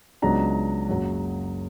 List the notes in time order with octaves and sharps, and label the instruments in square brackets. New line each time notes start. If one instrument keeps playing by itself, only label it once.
[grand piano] C#2 C#3 F#3 B3 D4 A#5
F#1 F#2 C#3 F#3